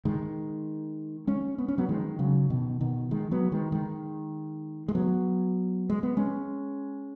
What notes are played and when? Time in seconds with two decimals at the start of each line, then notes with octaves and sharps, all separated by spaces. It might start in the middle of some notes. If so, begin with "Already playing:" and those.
0.05 D#3 G#3
1.27 G#3 C#4
1.58 B3
1.68 C#4
1.78 F#3 B3
1.89 D#3 G#3
2.19 C#3 F#3
2.50 B2 D#3
2.81 B2 D#3
3.11 D#3 G#3
3.31 F#3 B3
3.52 D#3 G#3
3.72 D#3 G#3
4.88 G#3
4.95 F#3 B3
5.90 G#3
6.03 B3
6.17 G#3 C#4